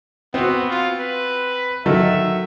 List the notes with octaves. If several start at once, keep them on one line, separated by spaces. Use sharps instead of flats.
B3 C4 F#4
F4
B4
D#3 F#3 A4 E5